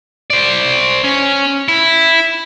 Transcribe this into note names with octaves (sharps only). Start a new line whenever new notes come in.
C5 D5
C#4
E4